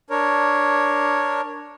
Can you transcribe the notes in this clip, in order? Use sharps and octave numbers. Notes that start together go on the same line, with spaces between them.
D4 A#4 C#5